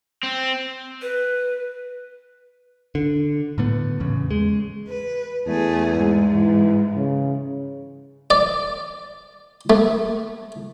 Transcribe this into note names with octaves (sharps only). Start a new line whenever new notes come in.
C4
B4
D3
A2 D3 A3 B3
A1 E2 C#3
G#3
B4
E2 A3 G#4
G#2
E3
C#3
D5
A3